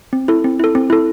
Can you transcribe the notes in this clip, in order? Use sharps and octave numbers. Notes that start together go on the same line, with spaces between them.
C4
E4 A4
C4
E4 A4
C4
E4 A4